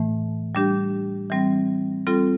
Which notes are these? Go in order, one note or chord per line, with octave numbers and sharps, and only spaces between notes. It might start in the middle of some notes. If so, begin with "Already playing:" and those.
Already playing: A2 E3 A3
G3 D4 G4
E3 G3 C4
G3 C4 F4 A4